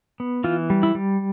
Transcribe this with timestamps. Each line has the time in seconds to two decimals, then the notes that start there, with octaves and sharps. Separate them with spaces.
0.20 B3
0.44 E3 F4
0.70 G3
0.83 E4
0.95 G3